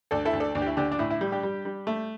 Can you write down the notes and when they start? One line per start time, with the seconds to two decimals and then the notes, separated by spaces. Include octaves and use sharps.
0.11 D2 A4 D5
0.25 E4 A4
0.33 D2
0.40 A4 D5
0.55 D2 D4
0.62 G4
0.66 E4
0.77 D3 D4 G4
0.92 D4
0.99 A2 E4
1.10 E4
1.21 G3
1.32 D4 G4
1.43 G3
1.65 G3
1.87 A3